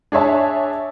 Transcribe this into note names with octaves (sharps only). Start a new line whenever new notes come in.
D4 G#4 C#5 E5 A5